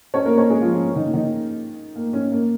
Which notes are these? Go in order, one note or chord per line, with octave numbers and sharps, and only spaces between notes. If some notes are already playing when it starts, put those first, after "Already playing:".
C#4 C#5
A#3 A#4
C#4 C#5
G#3 G#4
F3 F4
C#4
C#4
D#3 D#4
A#3
D#3 D#4
A#3
C#4
A#3